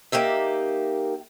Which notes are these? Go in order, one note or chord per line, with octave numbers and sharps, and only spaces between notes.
A#3 D#4 G4 E5